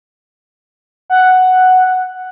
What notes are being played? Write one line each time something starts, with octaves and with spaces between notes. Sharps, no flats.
F#5